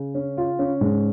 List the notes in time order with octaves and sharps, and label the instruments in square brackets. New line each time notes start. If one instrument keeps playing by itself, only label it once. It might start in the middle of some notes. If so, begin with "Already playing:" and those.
Already playing: [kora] C#3
[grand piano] C#4
F4
C#4
G#2